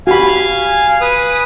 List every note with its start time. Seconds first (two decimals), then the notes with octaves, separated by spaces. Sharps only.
0.07 F#4 G4 F5 G#5 B5
1.01 B4 D#6